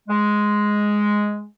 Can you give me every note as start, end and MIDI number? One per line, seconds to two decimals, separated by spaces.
0.08 1.45 56